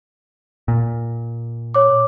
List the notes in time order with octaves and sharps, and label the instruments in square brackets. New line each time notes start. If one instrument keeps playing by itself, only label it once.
[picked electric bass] A#2
[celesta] C#5 D6